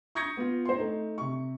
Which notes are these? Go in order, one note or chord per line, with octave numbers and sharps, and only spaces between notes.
C#6 D#6 G6 G#6 A#6 C#7
B3 F4
C5 C6
A3 D#4
C3 C#6